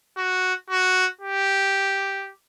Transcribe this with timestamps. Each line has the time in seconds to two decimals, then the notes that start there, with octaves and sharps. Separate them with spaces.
0.17 F#4
0.70 F#4
1.21 G4